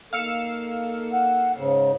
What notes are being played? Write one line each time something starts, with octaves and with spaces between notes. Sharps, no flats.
A#3 D#4 A4 F5 E6 C#7
F#5
G#2 C#3